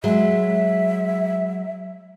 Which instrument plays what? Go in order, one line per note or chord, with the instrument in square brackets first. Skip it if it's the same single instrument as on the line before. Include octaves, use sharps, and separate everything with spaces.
[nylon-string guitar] F#3 G#3 [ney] E5